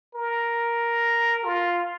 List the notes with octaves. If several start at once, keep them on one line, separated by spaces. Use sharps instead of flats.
A#4
F4